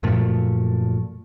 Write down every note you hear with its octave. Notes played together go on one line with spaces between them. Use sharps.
F#2 A#2 F3 A3